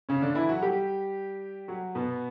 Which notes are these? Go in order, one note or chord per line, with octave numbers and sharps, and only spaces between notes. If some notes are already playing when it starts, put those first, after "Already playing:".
C#3 C#4
D3 D4
E3 E4
F#3 F#4
G3 G4
F#3 F#4
B2 B3